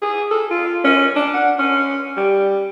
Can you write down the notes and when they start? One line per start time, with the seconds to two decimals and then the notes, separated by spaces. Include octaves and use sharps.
0.02 G#4
0.31 A4
0.51 F4
0.84 C#4
1.16 D4
1.34 F#5
1.58 C#4
2.17 G3